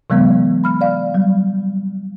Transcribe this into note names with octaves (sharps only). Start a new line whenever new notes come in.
C3 E3 F#3 G#3 B3
B5 F6
D5 F5
F#3 G3